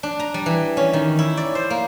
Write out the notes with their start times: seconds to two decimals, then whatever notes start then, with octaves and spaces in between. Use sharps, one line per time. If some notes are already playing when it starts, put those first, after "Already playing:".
0.03 D4
0.20 A#5
0.34 G3
0.46 E3
0.77 C#4
0.93 D#3
1.19 E4
1.37 D5
1.55 C5
1.70 A#3